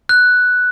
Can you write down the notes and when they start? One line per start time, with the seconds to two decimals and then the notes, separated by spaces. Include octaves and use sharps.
0.09 F#6